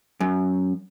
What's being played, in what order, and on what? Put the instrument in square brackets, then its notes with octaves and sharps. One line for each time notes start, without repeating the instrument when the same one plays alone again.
[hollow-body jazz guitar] F#2